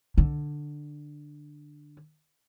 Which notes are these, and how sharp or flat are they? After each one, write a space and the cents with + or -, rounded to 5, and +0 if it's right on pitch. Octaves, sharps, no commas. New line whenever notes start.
D3 +10